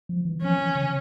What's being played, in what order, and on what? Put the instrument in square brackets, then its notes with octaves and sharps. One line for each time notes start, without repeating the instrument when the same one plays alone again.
[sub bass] F3
E3
[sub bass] F3 [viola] C#4
[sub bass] E3
C#3